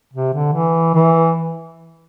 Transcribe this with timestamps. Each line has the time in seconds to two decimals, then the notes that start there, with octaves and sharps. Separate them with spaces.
0.14 C3
0.33 D3
0.53 E3
0.95 E3